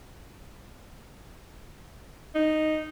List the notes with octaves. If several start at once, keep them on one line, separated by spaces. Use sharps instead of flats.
D#4